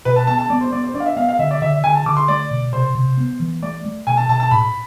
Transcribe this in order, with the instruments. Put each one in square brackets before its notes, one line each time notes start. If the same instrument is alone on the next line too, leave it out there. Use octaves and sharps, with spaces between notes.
[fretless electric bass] B2 [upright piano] B4
[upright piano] A5
[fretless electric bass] B3 [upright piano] A5
[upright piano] A5
[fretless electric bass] B3 [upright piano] D5
[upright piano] C5
[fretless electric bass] B3 [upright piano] D5
[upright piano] C5
[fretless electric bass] D4 [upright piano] D5
[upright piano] F5
E5
[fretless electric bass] B3 [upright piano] F5
[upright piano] F5
[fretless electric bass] D3 [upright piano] E5
[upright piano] D5
[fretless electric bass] D3 [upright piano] E5
[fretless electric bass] D3 [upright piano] G#5
[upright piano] A5
[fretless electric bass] D3 [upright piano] D6
[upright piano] C6
[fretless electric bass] A3 [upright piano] D5
[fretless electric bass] B2
[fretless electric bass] C3 [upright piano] C5
[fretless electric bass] C3
B3
E3
[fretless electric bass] A3 [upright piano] D5
[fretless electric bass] A3
[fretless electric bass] B2 [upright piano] G#5
[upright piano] A5
[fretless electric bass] B2 [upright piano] A5
[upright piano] A5
[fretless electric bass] A2 [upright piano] B5